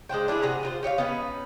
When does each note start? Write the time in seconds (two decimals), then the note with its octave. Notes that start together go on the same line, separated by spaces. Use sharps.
0.09 G#3 D4 C5 G5
0.28 D4 E4 F4 G#4
0.42 C3 G#4 F#5 A#5
0.63 F4 B4 C5
0.83 G4 C#5 E5 F5
0.98 B3 C#4 D#4 B4